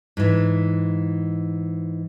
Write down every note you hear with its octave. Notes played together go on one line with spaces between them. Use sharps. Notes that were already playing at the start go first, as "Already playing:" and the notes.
G#2 E3